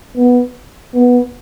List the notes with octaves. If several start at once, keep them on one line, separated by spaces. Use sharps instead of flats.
B3
B3